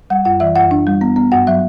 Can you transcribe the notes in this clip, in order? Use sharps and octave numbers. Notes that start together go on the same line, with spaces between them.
G3 F#5
F#2 F#5
E3 E5
F#2 F#5
D4
G3
B3
B3
G2 F#5
F#3 E5